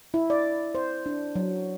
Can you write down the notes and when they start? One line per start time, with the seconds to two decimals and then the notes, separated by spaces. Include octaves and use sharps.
0.14 E4
0.30 D5
0.75 C5
1.06 D4
1.36 F#3